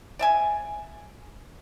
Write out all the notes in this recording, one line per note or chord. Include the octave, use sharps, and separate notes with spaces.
D5 E5 G#5